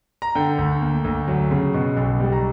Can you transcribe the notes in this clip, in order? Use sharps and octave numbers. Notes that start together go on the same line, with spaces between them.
A#5
D3 G5
D2
A#3
D2
F#3
C#3
B2
B1
G3
A#5